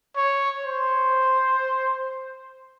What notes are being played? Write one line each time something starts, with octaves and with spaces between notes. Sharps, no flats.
C#5
C5